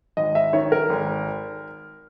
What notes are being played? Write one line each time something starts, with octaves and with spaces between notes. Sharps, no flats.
G#1 D#5
E5
D#3 C#5
A#4
G#1